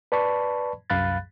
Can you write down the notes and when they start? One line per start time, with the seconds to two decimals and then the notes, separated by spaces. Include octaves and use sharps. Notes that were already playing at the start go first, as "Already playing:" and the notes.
0.12 B4 D5 A5 B5 C#6
0.90 C2 F#2 F5 B5 F#6 A6